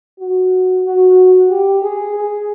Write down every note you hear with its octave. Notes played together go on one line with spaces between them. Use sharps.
F#4
F#4
G4
G#4
G#4